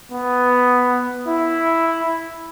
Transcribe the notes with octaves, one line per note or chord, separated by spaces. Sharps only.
B3
E4